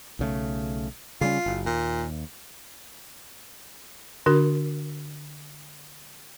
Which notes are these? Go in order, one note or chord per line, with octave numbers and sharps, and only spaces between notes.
B1 C#3 A3
C#3 G3 C#4 F4
F#1
D#2 A#2
D3 D4 F#4 A#4